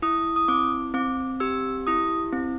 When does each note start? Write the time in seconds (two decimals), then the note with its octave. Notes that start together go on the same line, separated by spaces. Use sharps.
0.02 E4 D#6
0.36 D#6
0.48 C4 D6
0.94 C4 D6
1.40 G4 E6
1.87 E4 D#6
2.33 C4